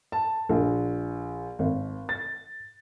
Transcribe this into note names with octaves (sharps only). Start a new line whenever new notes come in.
A5
A#1
G#1
A6